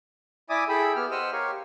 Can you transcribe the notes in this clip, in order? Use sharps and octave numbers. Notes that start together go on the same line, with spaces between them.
E4 D5 E5 G#5 D6 D#6
E4 G#4 A4 E5 G5 B5
B3 G4 F6
C5 D#5 F#5 E6 F6
G4 A#4 C#5 F5